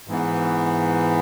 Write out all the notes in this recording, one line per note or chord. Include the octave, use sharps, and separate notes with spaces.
G#2 E3 B3